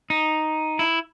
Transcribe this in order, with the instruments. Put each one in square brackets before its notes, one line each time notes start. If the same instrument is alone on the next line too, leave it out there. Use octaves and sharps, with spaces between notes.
[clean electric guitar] D#4
E4